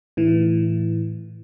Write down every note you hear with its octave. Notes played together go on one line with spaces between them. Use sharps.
A2 E3